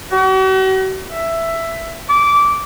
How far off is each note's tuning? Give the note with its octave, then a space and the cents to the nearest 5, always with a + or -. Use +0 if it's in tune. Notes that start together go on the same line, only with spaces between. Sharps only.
F#4 +45
E5 +10
D6 -15